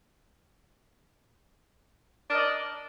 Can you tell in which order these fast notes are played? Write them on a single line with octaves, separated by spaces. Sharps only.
D4 A#4 D#5 D5